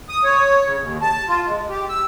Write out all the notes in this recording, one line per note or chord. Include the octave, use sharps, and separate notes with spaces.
D#6
C#5
C#3
D#2
A5
F4
G#3
G4
E6